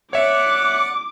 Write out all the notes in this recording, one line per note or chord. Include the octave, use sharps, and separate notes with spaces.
C#5 D5 E5 F#5 D6 F#6